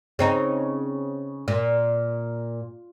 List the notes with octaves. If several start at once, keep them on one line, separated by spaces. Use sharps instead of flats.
C#3 C4 D#4
A#2